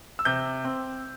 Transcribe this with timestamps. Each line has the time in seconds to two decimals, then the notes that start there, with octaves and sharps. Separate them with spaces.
0.19 E6
0.25 C3 G6
0.65 C4